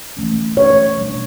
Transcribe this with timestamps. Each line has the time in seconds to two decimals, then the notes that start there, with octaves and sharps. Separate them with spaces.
0.17 E3 A3 C#4
0.57 C#5
0.97 B2 G3 D4